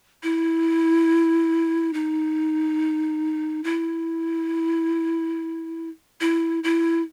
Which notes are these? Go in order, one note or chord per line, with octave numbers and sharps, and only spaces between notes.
E4
D#4
E4
E4
E4